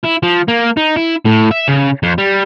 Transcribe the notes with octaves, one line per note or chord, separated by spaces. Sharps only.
E4
F3
A#3
D#4
E4
A2
E5
C#3
F2
G3